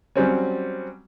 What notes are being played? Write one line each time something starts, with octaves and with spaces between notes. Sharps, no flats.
F#3 G3 C4 C#4